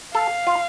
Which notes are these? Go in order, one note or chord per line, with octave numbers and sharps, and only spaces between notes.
A4 F5
F4